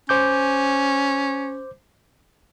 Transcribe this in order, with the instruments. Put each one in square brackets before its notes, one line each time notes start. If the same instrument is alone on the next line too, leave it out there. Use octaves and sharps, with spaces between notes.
[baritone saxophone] C#4 [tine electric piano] C5 D6 G6